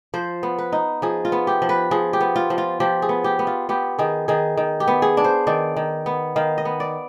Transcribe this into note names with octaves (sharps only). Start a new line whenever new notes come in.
F3 C5
B3
B4
D#4
F3 G#4
F4
B3
G4
F3
B4
F3 G#4
G4
B3
F4
F3
F4
F3 G4
G#4
B3
G4
B3
F4
B3 G4
D#3 G#4
D#3 G#4
D#3
G4
B3
G#4
D4
C5
D#3 D5
D#3
B3
D#3 F5
D#5
B3
D5